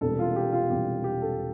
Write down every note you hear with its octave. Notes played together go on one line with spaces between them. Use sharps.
E1 E2 C3 G3 A4
F4
G4
F4
E1 E2 C3 G3 G4
G4
A4